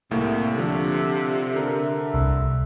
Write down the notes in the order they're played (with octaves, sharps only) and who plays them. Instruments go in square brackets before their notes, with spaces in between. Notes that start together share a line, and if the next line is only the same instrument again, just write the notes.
[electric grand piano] C2 A2 A#3 [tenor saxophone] C3
[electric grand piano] D3 F3 [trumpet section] E5
[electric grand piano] D3 A#4
[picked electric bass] C2